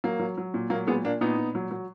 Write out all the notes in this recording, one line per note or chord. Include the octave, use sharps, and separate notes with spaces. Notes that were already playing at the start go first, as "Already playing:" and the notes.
F#3 A#3
F#3
F#3
A#2
F#3 A#3
A#2 G#3 B3
A#2 A#3 D4
A#2 B3 D#4
A#2
F#3
F#3